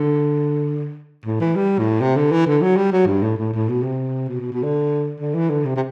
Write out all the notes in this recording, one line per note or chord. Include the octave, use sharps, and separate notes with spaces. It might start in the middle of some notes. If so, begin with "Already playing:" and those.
Already playing: D3
A2
E3
G3
A2
C3
D3
E3
D3
F#3
G3
F#3
G2
A2
A2
A2
B2
C3
B2
B2
B2
D3
D3
E3
D3
C3
C3